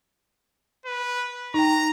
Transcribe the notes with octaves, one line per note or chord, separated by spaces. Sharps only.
B4
D#4 G5 A#5